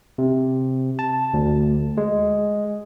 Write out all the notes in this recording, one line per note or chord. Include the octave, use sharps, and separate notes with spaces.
C3
A5
D2
G#3